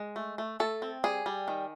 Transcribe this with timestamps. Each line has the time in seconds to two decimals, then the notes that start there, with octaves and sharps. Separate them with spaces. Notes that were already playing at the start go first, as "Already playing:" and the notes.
Already playing: G#3
0.16 A3
0.38 A3
0.60 A3 A4
0.82 C4
1.04 G3 G#4
1.26 G3
1.48 D#3